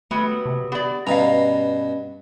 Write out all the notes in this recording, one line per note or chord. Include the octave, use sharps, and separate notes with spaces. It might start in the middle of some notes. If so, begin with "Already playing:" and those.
F#3 G3 A3 B3
C3
B3 G4 D5
G2 B2 C#4 F5 A#5